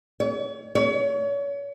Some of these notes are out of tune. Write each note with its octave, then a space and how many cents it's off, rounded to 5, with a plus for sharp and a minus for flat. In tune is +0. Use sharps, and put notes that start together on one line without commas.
C#5 +40
C#5 +35